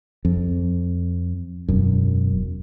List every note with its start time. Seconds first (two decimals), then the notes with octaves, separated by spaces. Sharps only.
0.25 F2
1.68 E1 F#2